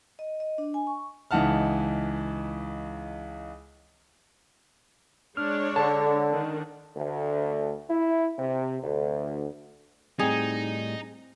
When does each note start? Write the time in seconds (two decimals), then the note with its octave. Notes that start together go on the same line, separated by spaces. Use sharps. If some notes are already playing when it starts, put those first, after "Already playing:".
0.19 D#5
0.40 D#5
0.58 D4
0.74 G#5
0.87 C#6
1.31 C#2 E3 D#4 F#5 A5 F6
5.37 G#3 D4 C#5 F6
5.76 D3 A5
6.30 D#3 D4
6.96 D2
7.90 E4
8.39 C3
8.83 D2
10.19 A2 G3 C4 D#4 G#4